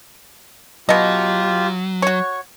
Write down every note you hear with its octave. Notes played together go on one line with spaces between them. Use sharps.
B2 F#3 F4 G4 D#5
F#4 C#5 C#6